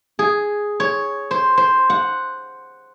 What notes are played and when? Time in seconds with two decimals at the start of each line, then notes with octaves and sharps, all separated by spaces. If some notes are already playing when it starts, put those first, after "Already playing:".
0.19 G#4
0.80 C#5
1.31 C5
1.57 C5
1.90 F#5